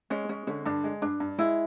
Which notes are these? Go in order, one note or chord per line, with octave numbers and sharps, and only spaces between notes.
G#3 C#4
G#3 C#4
D3 C#4
G2 D4
G#3
G2 D4
G2
G#3 E4